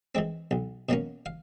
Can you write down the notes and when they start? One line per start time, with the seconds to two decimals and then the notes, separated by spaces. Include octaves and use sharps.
0.15 E3 G#3 C4
0.51 B1
0.89 B2 F#3 A#3 C#4
1.26 F5